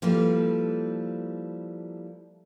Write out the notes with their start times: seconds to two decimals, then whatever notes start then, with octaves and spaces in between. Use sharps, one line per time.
0.02 F3 G3 A#3 E4 A4 B4